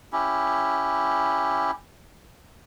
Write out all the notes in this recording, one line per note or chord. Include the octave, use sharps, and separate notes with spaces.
C#4 E4 G4